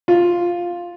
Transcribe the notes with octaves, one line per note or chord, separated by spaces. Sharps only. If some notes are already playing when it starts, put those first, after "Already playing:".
F4